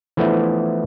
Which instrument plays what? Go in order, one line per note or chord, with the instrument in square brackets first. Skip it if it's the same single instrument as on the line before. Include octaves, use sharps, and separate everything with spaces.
[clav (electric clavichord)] E3 F3 A3 B3 D4 E4